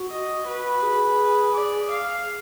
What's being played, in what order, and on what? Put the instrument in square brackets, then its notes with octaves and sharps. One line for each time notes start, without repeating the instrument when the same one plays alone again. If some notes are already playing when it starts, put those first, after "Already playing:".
Already playing: [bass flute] F#4
[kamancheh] D#5
B4
[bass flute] G#4
[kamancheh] D5
F5